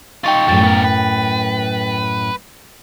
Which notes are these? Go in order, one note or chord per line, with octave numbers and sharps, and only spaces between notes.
D#4 F4 G5 C#6 A6
F#2 A2 F3 G3 G5 A6
B3 A#4
B4